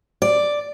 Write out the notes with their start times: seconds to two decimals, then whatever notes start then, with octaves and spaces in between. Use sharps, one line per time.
0.22 D5